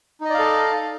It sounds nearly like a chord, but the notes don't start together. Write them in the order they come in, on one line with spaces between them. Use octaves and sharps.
D#4 D#5 D5 F5 A4